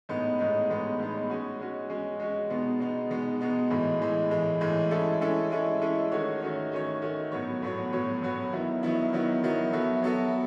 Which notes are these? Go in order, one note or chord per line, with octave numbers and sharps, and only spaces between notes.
A2 G#3 B3 D#4
A2 G#3 B3 D#4
A2 G#3 B3 D#4
A2 G#3 B3 D#4
G#3 C#4 F#4
G#3 C#4 F#4
G#3 C#4 F#4
G#3 C#4 F#4
B2 G#3 B3 D#4
B2 G#3 B3 D#4
B2 G#3 B3 D#4
B2 G#3 B3 D#4
A2 E3 G#3
A2 E3 G#3
A2 E3 G#3
A2 E3 G#3
G#3 C#4 E4 A4
G#3 C#4 E4 A4
G#3 C#4 E4 A4
G#3 C#4 E4 A4
D#3 A3 C#4 F#4 C#5
D#3 A3 C#4 F#4 C#5
D#3 A3 C#4 F#4 C#5
D#3 A3 C#4 F#4 C#5
A2 F#3 B3 F#4 C#5
A2 F#3 B3 F#4 C#5
A2 F#3 B3 F#4 C#5
A2 F#3 B3 F#4 C#5
D#3 F#3 B3 E4
D#3 F#3 B3 E4
D#3 F#3 B3 E4
D#3 F#3 B3 E4
F#3 B3 F#4 A4 E5
F#3 B3 F#4 A4 E5